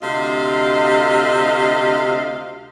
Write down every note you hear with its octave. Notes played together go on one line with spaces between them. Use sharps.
D2 C3 F4 D#5 F5